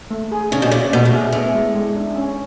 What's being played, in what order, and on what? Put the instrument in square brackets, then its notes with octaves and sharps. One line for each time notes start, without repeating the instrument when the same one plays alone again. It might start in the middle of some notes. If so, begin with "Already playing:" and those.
[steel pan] A3
G#4
[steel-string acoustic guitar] C#3 [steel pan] D4
[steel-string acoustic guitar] B2
[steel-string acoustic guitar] C#3 [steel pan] D5
[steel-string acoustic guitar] B2 [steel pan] A3
[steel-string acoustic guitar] A2
[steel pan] G#4
[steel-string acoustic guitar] A2 [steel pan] B3
[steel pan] G#3
G#3
D4
C#4